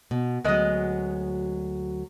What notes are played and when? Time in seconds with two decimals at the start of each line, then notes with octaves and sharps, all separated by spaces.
0.11 B2
0.44 D2 F#3 G#3 B3 D#5